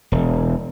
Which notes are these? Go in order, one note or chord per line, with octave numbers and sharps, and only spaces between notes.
E1